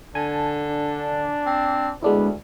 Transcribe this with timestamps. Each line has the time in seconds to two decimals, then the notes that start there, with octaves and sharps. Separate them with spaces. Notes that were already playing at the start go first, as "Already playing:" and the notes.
0.15 D3 G#5 A5
0.66 D4
1.46 C4
2.02 D2 G#3 B3 D4 E4